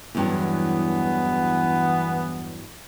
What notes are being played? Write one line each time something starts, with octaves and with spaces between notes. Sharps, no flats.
E2 G2 E3 F#3 B3